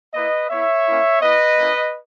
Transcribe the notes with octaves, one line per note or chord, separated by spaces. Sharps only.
A#3 E4 B4 D#5
B3 E4 C#5 E5
A#3 C#4 E4
B3 E4 B4 D#5
A#3 C#4 E4